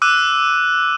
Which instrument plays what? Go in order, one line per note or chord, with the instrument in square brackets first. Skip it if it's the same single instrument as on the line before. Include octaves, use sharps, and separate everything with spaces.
[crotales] D6 E6 F#6 D#7